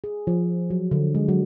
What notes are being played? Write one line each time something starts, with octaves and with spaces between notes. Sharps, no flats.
G#4
F3
F#3
D3
G#3
F#3